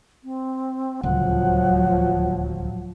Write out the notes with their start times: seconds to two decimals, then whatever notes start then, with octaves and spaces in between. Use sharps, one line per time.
0.24 C4
1.03 D1 C#2 F3 F#3 F#5